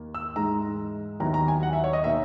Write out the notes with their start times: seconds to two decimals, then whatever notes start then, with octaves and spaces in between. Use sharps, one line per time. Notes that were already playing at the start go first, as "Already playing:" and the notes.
Already playing: D#2 D#3 A#3
0.14 E6
0.36 G#2 E3 G#3 D#4 A#5
1.20 D#2 D#3 F#3 B3 E4 A#5
1.34 A#5
1.48 G#5
1.63 F#5
1.73 E5
1.84 C#5
1.93 D#5
2.04 B2 A#3 D#4 E5